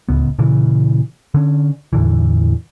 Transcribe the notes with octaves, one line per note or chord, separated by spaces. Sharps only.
D1 C#2 B3
A#2 C#3 E3
D3 C#4
E2 A2 D3 E3